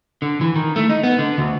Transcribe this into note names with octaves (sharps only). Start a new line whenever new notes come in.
D3
E3
D#3
A3
D#4
B3
D3
D2